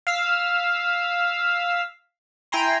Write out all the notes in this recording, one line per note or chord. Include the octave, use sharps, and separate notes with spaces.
F5 E6 B6
E4 G5 G#5 A#5 C6